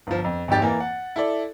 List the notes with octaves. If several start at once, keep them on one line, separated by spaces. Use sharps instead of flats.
G1 F3
F2
G#1 F2 G#2 G4 A6
E3 A#3
F#5
E4 A4 D5